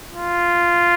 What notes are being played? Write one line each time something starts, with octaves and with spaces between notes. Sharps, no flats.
F4